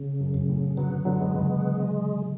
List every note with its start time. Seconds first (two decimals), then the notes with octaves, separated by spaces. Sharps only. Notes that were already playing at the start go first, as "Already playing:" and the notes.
Already playing: C#3
0.20 F#2
0.34 F#2
0.49 A2
0.77 D3 F#3 B3
1.05 D3 F#3
1.19 G#3
1.34 C#3 E3